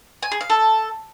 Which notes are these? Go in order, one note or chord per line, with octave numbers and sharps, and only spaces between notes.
G#5
G#4
F5
A4